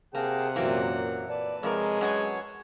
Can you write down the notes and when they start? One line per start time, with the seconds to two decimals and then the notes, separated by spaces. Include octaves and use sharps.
0.15 C3 A#3 G#4 F#5 G5 A5
0.56 F#2 A#2 E3 F#3 A#3 C4
1.29 B4 D5 A5
1.63 F2 C3 G#3 A#4 C#5
2.01 F#2 C#5 F#5 G#5